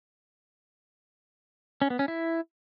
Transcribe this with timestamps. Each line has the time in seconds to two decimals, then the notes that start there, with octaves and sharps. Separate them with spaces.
1.82 C#4
1.90 B3
1.99 C#4
2.08 E4